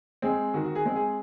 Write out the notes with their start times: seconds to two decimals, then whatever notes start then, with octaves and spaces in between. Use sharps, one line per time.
0.22 G#3 C4 G#4
0.54 D#3 F#4
0.65 F#4
0.75 G#4
0.85 G#3 C4
0.96 G#4